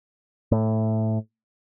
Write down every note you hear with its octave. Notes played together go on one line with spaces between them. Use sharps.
A2